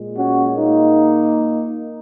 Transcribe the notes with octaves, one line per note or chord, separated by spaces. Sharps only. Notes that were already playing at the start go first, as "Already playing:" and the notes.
Already playing: A#2 G#3
C#4 F#4
A#3 D#4